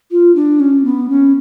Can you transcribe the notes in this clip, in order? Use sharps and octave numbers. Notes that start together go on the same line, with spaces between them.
F4
D4
C#4
B3
C#4